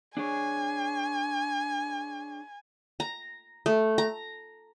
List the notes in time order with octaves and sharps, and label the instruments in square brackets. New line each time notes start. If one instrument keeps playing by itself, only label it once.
[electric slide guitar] D4 G#4 C#5 [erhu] G#5
[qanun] A#5
A3
A#5